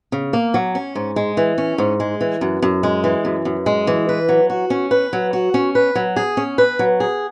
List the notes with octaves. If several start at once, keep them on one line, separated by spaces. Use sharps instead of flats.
C#3
A#3
F#3
C#4
G#2
G#3
E3
C#4
G#2
G#3
E3
F#2
F#2
G#3
E3
F#2
F#2
G#3
E3
B4
F#3
F#4
C#4
B4
F#3
F#4
C#4
B4
F#3
G#4
C#4
B4
F#3
G#4